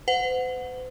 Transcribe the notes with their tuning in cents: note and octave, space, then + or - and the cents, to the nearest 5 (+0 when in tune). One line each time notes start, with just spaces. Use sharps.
C5 -45 F#5 -15